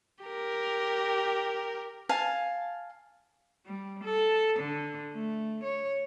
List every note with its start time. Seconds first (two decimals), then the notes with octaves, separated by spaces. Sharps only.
0.25 G4 A#4
2.09 F5 G#5 A5
3.66 G3
4.04 A4
4.60 D3
5.12 A3
5.64 C#5